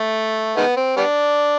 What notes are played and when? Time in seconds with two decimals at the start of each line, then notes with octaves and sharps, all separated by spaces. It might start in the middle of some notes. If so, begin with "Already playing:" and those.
Already playing: A3
0.57 D#3 G#3 B3
0.77 C4
0.96 G3 B3 D4